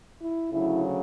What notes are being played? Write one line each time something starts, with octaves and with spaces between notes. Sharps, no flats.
E4
D2 C#3 F#3 E4